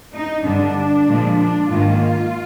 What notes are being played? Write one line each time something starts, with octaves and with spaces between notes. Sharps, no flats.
D#4
G2 D3 G3 D4
A#2 F3 G#3
D4
G#2 D#3 A#3 F4